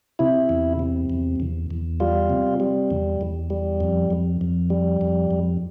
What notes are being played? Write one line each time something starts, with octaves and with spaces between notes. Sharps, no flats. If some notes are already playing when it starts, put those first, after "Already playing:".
C3 E4
E2
C3
E2
E2
E2
G3 F4
C3
G3
E2
E2
G3
F2
F2
F2
G3
F2
F2